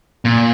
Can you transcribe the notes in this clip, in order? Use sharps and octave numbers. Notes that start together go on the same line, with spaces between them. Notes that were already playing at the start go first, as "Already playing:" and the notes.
A#2